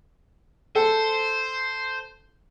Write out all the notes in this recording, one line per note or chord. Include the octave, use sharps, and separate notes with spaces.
A4 C5